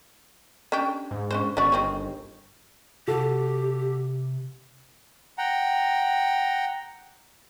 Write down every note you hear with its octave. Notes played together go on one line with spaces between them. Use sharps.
C#4 D4 G4
G#2
C#4 D4 C5
G1 C#4 F#4 D5
D#3 C4 C#4
C3 F#4 G4 A4
F#5 G5 A#5